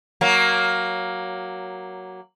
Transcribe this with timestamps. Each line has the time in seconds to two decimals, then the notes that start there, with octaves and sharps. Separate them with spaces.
0.21 F#3 A#3